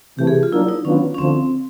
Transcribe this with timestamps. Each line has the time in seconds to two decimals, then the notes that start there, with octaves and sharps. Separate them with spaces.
0.18 C3 E3 A3 G4
0.27 G#4
0.43 F4
0.52 F#3 A#3 D4 E4
0.68 D#4
0.85 D#3 F#3 B3 C#4 D4 F4
1.15 C#4
1.18 D2 D3 F3 C4